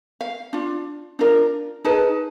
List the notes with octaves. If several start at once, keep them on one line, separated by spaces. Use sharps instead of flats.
F5
D4 F4
D4 F4 A#4
D#4 G#4 B4 A5